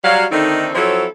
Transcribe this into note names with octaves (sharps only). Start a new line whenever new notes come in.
F#3 G3 F5
D3 D#3 A3 C4 D#4
F3 F#3 C4 E4 A4 C#5